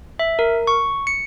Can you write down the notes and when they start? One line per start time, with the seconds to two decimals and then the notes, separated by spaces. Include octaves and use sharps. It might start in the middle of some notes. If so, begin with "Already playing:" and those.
0.19 E5
0.39 A#4
0.67 C#6
1.07 C#7